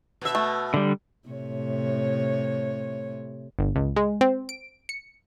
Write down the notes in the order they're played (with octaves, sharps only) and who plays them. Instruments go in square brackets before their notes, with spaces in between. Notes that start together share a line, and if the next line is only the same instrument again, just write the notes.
[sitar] B2 E5
[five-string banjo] A3
[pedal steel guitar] D3 G3
[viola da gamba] A2 C3 C#5
[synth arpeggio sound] G1
C#2
G#3
C4
D7
C#7